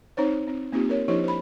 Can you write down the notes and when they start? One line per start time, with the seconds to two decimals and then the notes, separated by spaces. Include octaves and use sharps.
0.17 C4 D#4 C5 C#5
0.47 C4
0.72 A#3 C4 D#4 F4 G4
0.89 A#4 C#5
1.08 F3 D4 E4 G4 C5 C#5
1.24 C5 B5